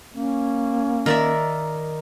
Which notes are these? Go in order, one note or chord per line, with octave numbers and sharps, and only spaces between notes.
A#3 C#4
D#3 A#4 D5 E5